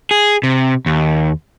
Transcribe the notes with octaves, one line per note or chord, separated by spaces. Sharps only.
G#4
C3
D#2